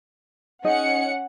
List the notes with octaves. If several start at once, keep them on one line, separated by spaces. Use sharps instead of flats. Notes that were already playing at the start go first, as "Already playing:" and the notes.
C#4 D#4 G#4 D#5 F#5 C#7